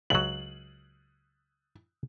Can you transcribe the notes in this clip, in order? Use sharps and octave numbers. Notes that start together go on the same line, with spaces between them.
C#2 F#3 F#7